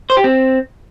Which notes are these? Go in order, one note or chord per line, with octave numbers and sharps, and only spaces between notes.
C5
G4
C4